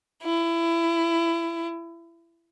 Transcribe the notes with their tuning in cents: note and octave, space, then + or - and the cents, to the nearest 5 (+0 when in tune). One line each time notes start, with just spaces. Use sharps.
E4 +25